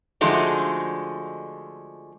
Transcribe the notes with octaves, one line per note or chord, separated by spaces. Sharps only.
D3 F3 G#3 A3 D#4 F#4